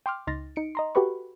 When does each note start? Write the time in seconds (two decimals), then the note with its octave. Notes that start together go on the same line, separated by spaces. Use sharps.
0.06 G5 C6 D6 F6
0.27 C#2 D#4 C6 F6 A6 A#6
0.56 D#4 C#7 D7
0.75 D#5 A#5 C6
0.95 F#4 G4 A4 B4 B5 C#6